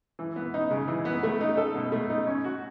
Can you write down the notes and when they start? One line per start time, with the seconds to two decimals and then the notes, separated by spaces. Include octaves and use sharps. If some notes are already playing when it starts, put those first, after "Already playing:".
0.19 E3
0.36 B3
0.54 D#4
0.71 C#3
0.88 E3
1.05 B3
1.23 A3
1.41 D#4
1.57 A4
1.75 B2
1.92 A3
2.10 D#4
2.27 C#4
2.44 F#4